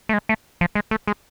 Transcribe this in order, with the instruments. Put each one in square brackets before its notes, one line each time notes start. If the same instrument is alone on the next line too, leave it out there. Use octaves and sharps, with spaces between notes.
[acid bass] A3
G#3
A3
F3
G#3
A3
G#3